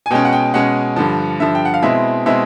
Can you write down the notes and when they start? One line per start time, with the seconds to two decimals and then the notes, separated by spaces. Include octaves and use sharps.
0.06 G#5
0.11 B2 G#3 C#4 G5
0.25 F#5
0.33 G5
0.54 B2 G#3 C#4 F#5
0.96 G2 D3 F3
1.40 G2 D3 F3 E5
1.55 G5
1.65 F#5
1.74 F5
1.82 B2 G#3 C4 E4 E5
2.26 B2 G#3 C4 E4 E5